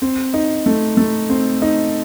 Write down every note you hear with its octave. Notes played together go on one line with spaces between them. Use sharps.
C4
D#4
A3
A3
C4
D#4